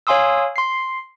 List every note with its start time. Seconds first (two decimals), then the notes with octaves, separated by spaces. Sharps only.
0.07 C#5 F5 G#5 C6 D#6 E6
0.56 C6 C7